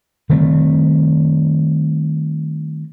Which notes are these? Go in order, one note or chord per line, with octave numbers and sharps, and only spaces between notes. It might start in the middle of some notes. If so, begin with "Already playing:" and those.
D#3 G3 A3 C4